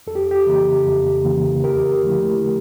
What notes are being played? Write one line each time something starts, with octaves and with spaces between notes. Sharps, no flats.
F2 A4
G4
G4
C#3 E3 A#3
F2
C#3 E3 A#3
E2 G4 A#4
D3 F3 A3 E4